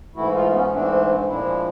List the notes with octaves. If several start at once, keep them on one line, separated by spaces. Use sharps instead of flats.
G#2 E3 A3 E4 F#4
D#4 F4
B3 C#4
G#2 E3 A3 C4 D4
A#2 F3 G#3 D4 E4